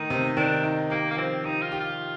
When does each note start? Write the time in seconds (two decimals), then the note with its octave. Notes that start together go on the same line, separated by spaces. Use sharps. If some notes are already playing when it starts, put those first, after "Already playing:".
Already playing: D#3 A3 D#4
0.10 C3
0.37 D#3 D4
0.63 D#4
0.90 A#3 G4
1.11 A#3
1.17 F3 C4
1.44 D#4 G4
1.62 F4
1.72 G4
1.80 F4